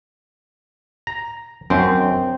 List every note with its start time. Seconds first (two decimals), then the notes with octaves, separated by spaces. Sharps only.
1.07 A#5
1.70 F#2 C4